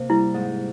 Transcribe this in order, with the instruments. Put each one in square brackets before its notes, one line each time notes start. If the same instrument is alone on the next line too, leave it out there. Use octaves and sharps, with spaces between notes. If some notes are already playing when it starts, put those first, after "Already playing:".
Already playing: [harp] C3 A#3
[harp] G3 [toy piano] E4
[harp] G#2